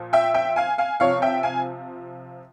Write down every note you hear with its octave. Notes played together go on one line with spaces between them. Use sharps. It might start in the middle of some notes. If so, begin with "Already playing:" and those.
Already playing: A#2 F3
E5 G5
E5 G5
F5 G#5
F5 G#5
C3 F3 C#5 F5
E5 G5
F5 G#5